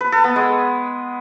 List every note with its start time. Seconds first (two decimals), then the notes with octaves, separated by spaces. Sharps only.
0.01 B4
0.12 A4
0.24 B3
0.36 G#3